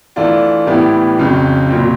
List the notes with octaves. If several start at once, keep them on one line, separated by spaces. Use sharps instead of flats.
E3 A3 D4 F4
A2 E3 G3 B3 E4
F2 C#3 F#3
C2 A#2 F#3